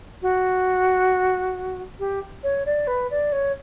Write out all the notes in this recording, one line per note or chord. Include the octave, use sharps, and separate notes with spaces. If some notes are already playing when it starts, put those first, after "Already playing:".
F#4
G4
C#5
D5
B4
D5
C#5